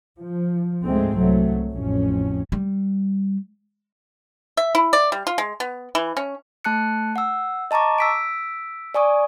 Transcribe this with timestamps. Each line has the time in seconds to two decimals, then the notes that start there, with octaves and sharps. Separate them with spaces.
0.20 F3
0.84 D2 G#2 G#3 A3 C4
1.16 C2 F#3 A3
1.72 A1 F2 C#4
2.52 G3
4.57 E5
4.75 E4
4.93 D5
5.12 G3
5.27 F4
5.38 G#3
5.60 B3
5.95 E3
6.17 C#4
6.65 A3 A5 F#6 C#7
7.16 F#5 E6
7.71 D#5 A5 A#5 C#6 D6
7.98 E6 B6 D7
8.94 D5 G#5 C#6 D#6